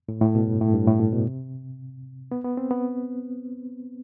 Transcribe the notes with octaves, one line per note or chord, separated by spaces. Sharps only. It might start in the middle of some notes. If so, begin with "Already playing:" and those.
A2
A2
B2
G2
A2
G2
A2
A2
B2
C3
B3
B3
C4
B3